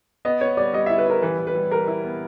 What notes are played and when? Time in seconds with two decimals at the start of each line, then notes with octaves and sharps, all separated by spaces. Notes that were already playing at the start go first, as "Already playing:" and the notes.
0.25 B3 D#5
0.41 B3 C#5
0.57 G3 D5
0.73 G3 D#5
0.86 E4 E5
0.98 B4
1.07 E4 A#4
1.22 E3 B4
1.39 E3
1.47 B4
1.55 G3
1.71 G3 A#4
1.87 E4
2.04 B3